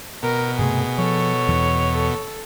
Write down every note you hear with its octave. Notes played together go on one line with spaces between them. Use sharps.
B2 A#4
G2 C3 A3 G#4
F3 A4 C#5
E2 E3
A4